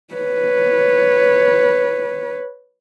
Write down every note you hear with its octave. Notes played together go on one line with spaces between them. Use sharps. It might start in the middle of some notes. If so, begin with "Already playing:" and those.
B4 C#5